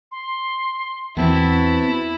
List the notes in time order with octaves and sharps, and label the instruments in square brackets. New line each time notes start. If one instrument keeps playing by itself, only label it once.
[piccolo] C6
[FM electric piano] E2 [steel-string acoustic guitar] B3 C4 F#4 [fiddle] E4 [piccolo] A5